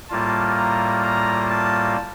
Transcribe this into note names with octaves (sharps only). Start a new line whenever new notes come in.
A2 G3 A#3 F4 A5
A#5
A#5
A5